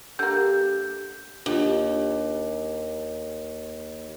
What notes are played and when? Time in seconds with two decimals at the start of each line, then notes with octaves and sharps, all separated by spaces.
0.19 D3 A#3 G4 G6
1.46 D#2 D4 F4 G4